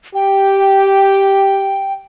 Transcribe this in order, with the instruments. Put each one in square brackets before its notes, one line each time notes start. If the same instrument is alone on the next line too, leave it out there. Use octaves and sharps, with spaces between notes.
[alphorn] G4 [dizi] G5